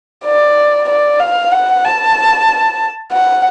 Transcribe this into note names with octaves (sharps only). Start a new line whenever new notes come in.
D5
D5
F5
F#5
A5
F#5